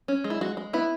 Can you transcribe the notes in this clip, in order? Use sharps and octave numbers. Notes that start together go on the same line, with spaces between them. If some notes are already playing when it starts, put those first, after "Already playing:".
C#4
G#3
E4
G#3 F#4
G#3
B3 E4